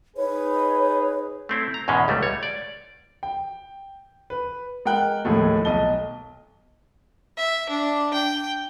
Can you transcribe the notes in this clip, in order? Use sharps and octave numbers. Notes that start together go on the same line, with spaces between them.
D#4 G#4 B4 C#5
A3 C4 E4
A#5
E2 G#2 B2 G#3 C#4
C#2 G3 A3
C#5
D5
G5
B4
G#3 A#4 F#5 G5 F#6
D#2 A2 F3 G#3 A3
B1 D#5 A5 G7
E5
D4
G5